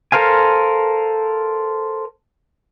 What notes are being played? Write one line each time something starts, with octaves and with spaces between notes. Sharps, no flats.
A4 A#4 C5 F5 G#5